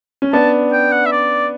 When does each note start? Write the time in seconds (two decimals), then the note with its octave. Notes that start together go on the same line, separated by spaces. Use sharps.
0.22 C#4
0.33 B3 D4 A5
0.73 G5
0.92 F#5
1.06 E5
1.12 D5